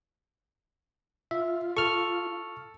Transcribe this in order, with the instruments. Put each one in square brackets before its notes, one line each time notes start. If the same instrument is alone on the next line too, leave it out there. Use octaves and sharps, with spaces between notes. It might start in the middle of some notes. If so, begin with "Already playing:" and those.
[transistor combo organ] F4 [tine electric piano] E5
[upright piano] A4 [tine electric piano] C#6 F6